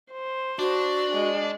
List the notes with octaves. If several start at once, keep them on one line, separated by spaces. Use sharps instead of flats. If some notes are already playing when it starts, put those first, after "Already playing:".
C5
D4 F#4
G#3